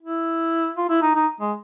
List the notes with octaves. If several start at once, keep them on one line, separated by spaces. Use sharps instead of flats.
E4
F4
E4
D#4
D#4
G#3